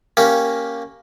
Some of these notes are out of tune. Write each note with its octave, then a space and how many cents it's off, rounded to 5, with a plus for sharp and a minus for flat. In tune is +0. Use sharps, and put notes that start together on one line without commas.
A#3 +0 C#4 +0 G4 +0